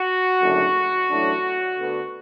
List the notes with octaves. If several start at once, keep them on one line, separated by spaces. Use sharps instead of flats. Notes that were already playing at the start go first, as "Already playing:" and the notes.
Already playing: F#4
F#1 F#2 D3 A3 D4
A1 A2 F#3 A3 D4
D2 D3 B3